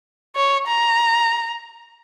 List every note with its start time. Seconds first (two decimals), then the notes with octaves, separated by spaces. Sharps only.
0.36 C#5
0.67 A#5